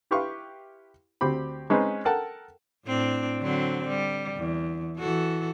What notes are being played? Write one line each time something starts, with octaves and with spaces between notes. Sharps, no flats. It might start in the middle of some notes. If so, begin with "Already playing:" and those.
E4 G4 B4 F5 C6 C#6
D2 C4 G4 B5
G#3 C4 C#4 D#4 B4 D#5
A4 A#4 F#5 G5 A5
A2 C4 D4
D3 F#3 C4
G3
E2
E3 F#4 A4